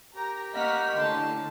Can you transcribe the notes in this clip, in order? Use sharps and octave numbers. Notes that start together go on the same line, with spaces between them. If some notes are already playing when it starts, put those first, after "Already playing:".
G4 A#4 A#5
A#3 D#5 F#5 C#6 F6 B6
A2 D3 A5 C6